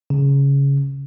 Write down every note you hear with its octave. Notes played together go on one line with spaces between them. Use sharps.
C#3